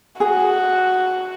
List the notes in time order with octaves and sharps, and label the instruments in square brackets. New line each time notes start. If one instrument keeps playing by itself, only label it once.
[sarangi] F#4 [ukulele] G#4